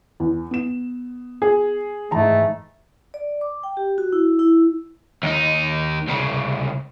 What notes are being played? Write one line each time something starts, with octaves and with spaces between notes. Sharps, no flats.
E2
B3 E7
G#4
G#2 E3 A3 A5 A#5
D5
D6
G5
G4
F#4
E4
E4
D#2 D#4
C2 C#3